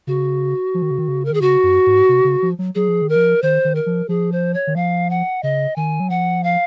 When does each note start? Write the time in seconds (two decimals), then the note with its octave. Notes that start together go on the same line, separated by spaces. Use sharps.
0.07 C#3 F#4
0.74 F3
0.82 D#3
0.91 C#3
0.99 D#3
1.08 C#3
1.25 A#4
1.30 D#3 G#4
1.41 C#3 F#4
1.63 F#2
1.86 G#2
2.09 C3
2.24 C#3
2.42 F3
2.59 F#3
2.75 F#3 G#4
2.88 F3
3.02 D#3
3.09 A#4
3.16 F3
3.42 D#3 C5
3.65 D#3
3.75 A#4
3.86 F3
4.09 F3 G#4
4.32 C5
4.54 C#5
4.67 D#3
4.76 F3 F5
5.10 F#5
5.43 C#3 D#5
5.76 D#3 G#5
6.00 F#3
6.10 F3 F#5
6.44 F5